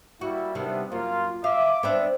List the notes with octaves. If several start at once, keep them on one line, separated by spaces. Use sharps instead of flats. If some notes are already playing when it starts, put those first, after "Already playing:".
G3 A#3 E4 F#4
C3 D#3 G3 B3 D4 E5
F#2 A#3 F4
E5 F5 D6
B3 C4 D4 E5